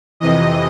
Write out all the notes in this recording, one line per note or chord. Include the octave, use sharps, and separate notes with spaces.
F2 C3 E3 D#5